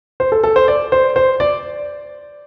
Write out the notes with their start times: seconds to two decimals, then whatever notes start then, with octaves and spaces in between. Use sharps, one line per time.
0.20 C5
0.32 A4
0.44 A4
0.56 C5
0.68 D5
0.92 C5
1.16 C5
1.40 D5